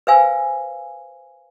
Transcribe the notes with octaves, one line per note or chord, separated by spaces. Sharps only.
B4 C5 F5 G#5 E6